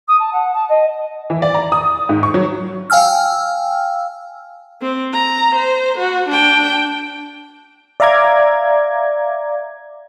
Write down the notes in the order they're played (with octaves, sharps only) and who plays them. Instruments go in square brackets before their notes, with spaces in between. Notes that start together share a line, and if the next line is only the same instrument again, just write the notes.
[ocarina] D#6
A5
F#5
A5
D#5
[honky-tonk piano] E3
D5
A#5
D#6
G#2
C#6
F#3
[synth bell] F5 G5 G#5 E6 F6
[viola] C4
A#5
C5
F#4
D4 G5
[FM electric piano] D5 E5 F5 A#5 D6 G#6